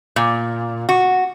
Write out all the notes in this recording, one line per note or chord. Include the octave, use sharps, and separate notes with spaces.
A#2
F#4